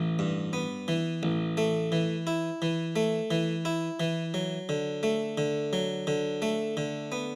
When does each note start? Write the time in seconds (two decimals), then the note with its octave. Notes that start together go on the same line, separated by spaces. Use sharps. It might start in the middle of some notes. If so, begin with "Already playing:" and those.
Already playing: A1 E3
0.19 G2
0.53 B3
0.88 E3
1.23 A1
1.57 A3
1.92 E3
2.27 E4
2.62 E3
2.96 A3
3.31 E3
3.65 E4
4.00 E3
4.34 F#3
4.69 D3
5.03 A3
5.38 D3
5.73 F#3
6.07 D3
6.42 A3
6.77 D3
7.12 B3